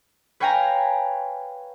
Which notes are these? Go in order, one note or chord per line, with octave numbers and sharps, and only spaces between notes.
B4 C#5 F5 G5 G#5 A#5